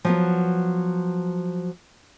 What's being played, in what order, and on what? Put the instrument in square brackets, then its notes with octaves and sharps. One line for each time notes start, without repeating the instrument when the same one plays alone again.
[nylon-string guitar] F3 F#3 B3